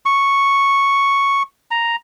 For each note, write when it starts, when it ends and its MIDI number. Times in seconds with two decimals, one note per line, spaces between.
0.06 1.43 85
1.71 1.96 82